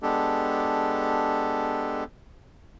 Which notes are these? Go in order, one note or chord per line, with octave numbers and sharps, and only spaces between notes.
G#3 B3 D4 G4 A4